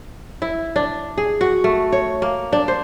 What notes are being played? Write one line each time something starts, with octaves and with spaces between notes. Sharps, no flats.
E4
D4
G#4
F#4
A3
C#5
A#3
D4
C5